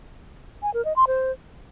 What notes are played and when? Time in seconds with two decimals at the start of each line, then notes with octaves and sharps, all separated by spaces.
0.63 G#5
0.74 A#4
0.85 D#5
0.96 C6
1.07 C5